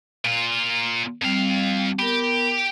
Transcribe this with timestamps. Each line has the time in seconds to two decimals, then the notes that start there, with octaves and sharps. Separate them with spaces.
0.25 A#2 F4
1.22 F2 G3 C4 F5
1.99 B3 G4 A#4